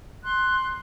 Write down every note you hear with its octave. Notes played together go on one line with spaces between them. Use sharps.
C6 F#6